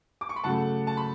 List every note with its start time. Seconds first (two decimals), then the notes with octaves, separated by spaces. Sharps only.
0.21 D6
0.29 C#6
0.36 B5
0.44 C#3 F#3 A3 F#5 A5
0.87 A5
0.97 B5